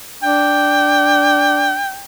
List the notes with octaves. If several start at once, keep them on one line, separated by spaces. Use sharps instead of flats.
D4 G5